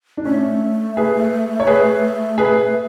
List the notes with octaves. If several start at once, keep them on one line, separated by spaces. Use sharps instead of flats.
D4
A3 C#4
G#4 B4
C#5
G#4 B4
G#4 B4